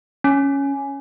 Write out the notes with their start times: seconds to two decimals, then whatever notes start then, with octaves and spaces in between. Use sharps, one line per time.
0.24 C#4